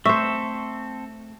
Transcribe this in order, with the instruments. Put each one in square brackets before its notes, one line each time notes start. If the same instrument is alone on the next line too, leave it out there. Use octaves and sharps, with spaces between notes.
[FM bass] A3 [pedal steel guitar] C4 A4 [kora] C5 E5 [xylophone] C#6